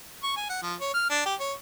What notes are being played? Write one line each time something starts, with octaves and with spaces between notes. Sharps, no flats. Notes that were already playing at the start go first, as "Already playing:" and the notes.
C#6
G#5
F#5
F3
C#5
F6
D4
G4
C#5